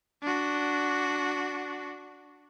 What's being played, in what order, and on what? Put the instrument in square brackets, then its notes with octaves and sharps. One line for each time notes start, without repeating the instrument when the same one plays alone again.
[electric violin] D4 F#4